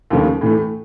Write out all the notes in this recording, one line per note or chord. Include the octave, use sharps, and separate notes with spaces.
D#2 C#3 F3 A3
A2 E3 A3